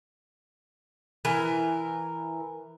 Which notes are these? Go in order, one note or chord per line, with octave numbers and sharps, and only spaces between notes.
E3 A#4